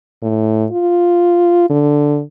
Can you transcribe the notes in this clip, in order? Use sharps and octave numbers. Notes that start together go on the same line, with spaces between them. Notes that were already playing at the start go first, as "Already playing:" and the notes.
A2
F4
D3